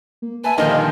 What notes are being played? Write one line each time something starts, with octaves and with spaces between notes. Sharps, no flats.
A#3
B4 E5 G#5 A5
A#2 D3 D#3 F3 G3 A#3 D#4 D#5